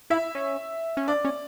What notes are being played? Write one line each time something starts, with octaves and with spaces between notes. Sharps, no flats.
E4 E5
C#4
C#4
D4 D5
C#4